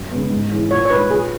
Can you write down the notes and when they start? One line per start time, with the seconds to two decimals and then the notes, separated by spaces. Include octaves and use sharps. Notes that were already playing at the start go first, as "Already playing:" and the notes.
Already playing: F#2
0.10 C#3 G#3 B3
0.30 G#2
0.51 E3 G#3 C#4 E4
0.71 A#2 C#5
0.85 C#5
0.90 G#3 D#4 B4
1.11 A#2 G#4